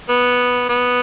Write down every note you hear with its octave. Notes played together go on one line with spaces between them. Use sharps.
B3
B3